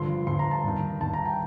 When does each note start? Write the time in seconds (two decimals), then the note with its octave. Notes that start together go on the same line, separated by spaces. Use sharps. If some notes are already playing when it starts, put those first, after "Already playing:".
Already playing: G2 D3 F3 C6
0.27 G2 D3 F3 C6
0.39 A#5
0.51 A5
0.64 G2 D#3
1.01 G2 D#3 A5
1.14 A#5
1.25 G5